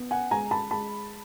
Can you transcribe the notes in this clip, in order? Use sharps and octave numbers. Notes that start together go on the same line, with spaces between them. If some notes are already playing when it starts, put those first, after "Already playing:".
Already playing: B3
F#5 G#5
G#3 G#5 A#5
A5 B5
G#3 A5 B5